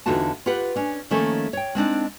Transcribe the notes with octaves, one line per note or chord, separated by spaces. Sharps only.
E2 D3 D#4 F4 F#4 A5
F4 G4 B4 F#5
C#4 D4
D#3 F3 A3 A#3 C#4 D#4
C#5 G5
G#3 C4 D4 D#4